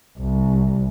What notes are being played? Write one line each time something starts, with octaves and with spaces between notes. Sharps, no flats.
C2